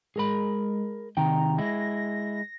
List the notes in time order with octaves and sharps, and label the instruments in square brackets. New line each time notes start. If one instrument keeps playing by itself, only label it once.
[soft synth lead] G#3 [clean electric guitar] G#4 A#4 B5
[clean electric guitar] C3 D#3 G5 [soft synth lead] A#5
[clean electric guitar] G#3 E4 [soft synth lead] A#6